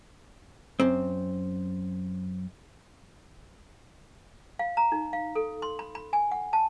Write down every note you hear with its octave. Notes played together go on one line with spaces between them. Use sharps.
F#2 C4
F5
A#5
D#4
F5
A4
C6
B5
B5
G#5
F#5
A5